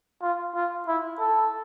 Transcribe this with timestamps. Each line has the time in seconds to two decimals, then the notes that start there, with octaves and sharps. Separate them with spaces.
0.22 F4
0.55 F4
0.88 E4
1.20 A4